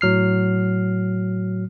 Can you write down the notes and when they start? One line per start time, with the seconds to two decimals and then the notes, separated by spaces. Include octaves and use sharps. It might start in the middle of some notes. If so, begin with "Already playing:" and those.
0.01 A2 F#3 F6 C7